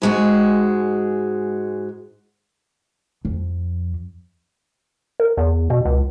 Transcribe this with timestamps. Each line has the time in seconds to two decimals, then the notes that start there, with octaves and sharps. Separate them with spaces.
0.02 G#2 G#3 F#4
3.25 F2
5.20 A#4
5.37 E2
5.70 B2
5.85 C#2